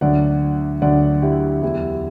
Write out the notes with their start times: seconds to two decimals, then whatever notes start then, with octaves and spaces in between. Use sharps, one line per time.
0.01 D2 D3 F#3 D5 F#5
0.82 D2 D3 F#3 D5 F#5
1.22 E4 G4
1.62 E2 D3 F#3 E4 G4